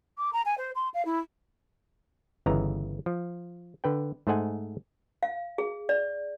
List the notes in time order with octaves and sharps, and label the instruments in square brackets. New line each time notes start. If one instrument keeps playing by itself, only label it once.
[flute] D6
A#5
G#5
C5
C6
F5
E4
[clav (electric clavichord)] G1 C#3 E3 D#5 A#5
F3
D3 B4 G5
G#2 A3 C5 D#5 F#5 G#5
[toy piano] F5
G#4
D5